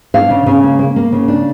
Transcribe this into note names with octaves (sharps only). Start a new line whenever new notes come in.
D4 F5
C#3
C#3
A#3
A#3
A#3
C#3
D4